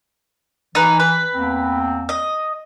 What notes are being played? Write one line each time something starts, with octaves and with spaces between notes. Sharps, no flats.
E3 D#4 B4
B4
E2 A#3 C4
D#5